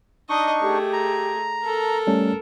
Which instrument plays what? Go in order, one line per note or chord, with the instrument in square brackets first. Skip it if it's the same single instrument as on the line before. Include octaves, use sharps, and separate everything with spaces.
[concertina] D4 D#4 C#6 [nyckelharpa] D#5
[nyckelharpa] A3 G#4 [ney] G4
[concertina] A#5
[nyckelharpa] A4 A#4 [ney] A5
[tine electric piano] G3 A3 C#4 [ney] A5